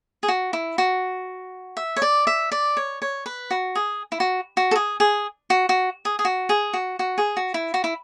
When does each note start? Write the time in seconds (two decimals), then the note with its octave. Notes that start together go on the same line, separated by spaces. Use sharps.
0.23 G#4
0.28 F#4
0.53 E4
0.78 F#4
1.77 E5
1.96 C#5
2.02 D5
2.27 E5
2.52 D5
2.77 C#5
3.02 C#5
3.26 B4
3.51 F#4
3.75 G#4
4.12 E4
4.20 F#4
4.57 F#4
4.71 A4
4.76 G#4
5.00 G#4
5.50 F#4
5.69 F#4
6.05 G#4
6.19 G#4
6.25 F#4
6.49 G#4
6.73 F#4
6.99 F#4
7.18 G#4
7.37 F#4
7.54 E4
7.74 F#4
7.84 E4